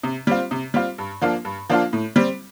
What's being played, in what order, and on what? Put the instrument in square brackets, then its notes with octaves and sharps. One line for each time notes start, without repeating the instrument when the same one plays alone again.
[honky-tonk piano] C3
G3 C4 F4
C3
G3 C4 F4
G2
F3 A#3 D4 F4
G2
F3 A#3 D4 F4
A2
G3 C4